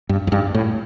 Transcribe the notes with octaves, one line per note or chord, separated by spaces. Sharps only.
G2
F2
G2
A2